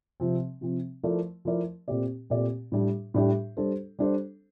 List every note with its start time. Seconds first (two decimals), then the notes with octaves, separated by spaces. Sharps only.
0.20 C3 F3 C4
0.61 C3 F3 C4
1.03 F3 A3 E4 A#4 D5
1.45 F3 A3 E4 A#4 D5
1.88 A#2 A3 C4 G4 D5
2.30 A#2 A3 C4 G4 D5
2.72 A2 G3 D4 G4
3.14 A2 G3 D4 G4
3.57 G3 D4 A4 C5
3.99 G3 D4 A4 C5